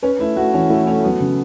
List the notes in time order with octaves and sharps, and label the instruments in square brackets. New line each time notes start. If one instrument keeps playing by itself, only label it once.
[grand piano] C#4 [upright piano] B4
[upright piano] A3 [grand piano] E4
[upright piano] A3 [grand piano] F#4
[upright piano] E3 [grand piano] C#4
[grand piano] A3 [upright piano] E4
[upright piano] A3 [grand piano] C#4
[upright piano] F#3 [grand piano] B3
[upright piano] C#3